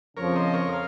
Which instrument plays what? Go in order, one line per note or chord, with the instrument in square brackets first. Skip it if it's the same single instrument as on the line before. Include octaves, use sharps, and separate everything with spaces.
[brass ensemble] F2 C#3 F3 [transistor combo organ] A#4 C#5
[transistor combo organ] C5 D#5
A#4 C#5
F5